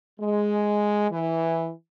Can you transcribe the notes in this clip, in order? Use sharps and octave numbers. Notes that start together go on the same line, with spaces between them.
G#3
E3